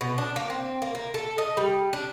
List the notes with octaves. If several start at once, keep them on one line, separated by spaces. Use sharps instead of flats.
B2
D4
A#3
C4
A#3
A#3
A4
D#5
G3
D4